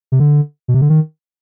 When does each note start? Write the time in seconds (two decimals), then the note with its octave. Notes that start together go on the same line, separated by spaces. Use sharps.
0.12 C3
0.20 D3
0.68 B2
0.74 C3
0.81 D3
0.89 D#3